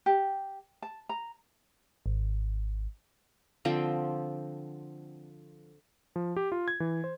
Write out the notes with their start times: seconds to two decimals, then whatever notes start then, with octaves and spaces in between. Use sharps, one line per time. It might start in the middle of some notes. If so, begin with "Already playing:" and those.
0.06 G4
0.82 A5
1.09 A#5
2.06 G#1
3.65 D3 F3 C4 G5
6.16 F3
6.36 G4
6.52 F4
6.68 G#6
6.80 E3
7.04 C5